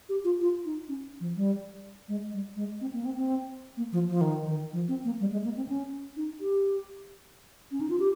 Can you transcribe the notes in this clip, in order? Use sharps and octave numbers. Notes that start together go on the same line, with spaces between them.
G4
F4
F4
D#4
C#4
F3
G3
G#3
G3
G#3
C4
A#3
C4
C4
A#3
F3
F3
D#3
D#3
F3
C4
A#3
G3
G#3
A#3
C4
C#4
D#4
G4
C#4
D#4
F4
G4